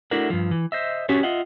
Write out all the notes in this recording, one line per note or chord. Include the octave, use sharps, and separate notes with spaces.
A3 D4 E4 F#4 A#4 F#5
G2 F3
E3
C5 D#5 E5
C#4 F#4 G4 C#5
F4 D#5 E5 F#5